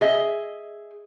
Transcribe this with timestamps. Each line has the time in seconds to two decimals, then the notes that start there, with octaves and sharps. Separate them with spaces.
0.01 G#4 D#5 E5